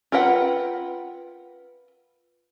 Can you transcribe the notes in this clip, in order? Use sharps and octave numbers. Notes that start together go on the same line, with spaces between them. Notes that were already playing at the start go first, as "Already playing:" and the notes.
F4 A#4 B4 F#5 G5